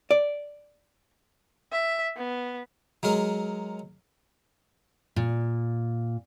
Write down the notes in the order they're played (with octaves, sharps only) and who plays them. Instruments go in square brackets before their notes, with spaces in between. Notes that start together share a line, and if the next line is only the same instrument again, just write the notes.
[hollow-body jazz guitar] D5
[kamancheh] E5
B3
[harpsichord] F#3 G#3 A#4
[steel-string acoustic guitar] A#2